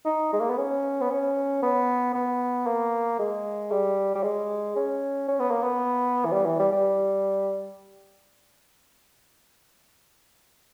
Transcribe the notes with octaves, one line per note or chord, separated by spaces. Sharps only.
D#4
G#3
A#3
B3
C#4
B3
C#4
B3
B3
A#3
G#3
G3
G3
G#3
C#4
C#4
B3
A#3
B3
E3
G3
E3
G3
G3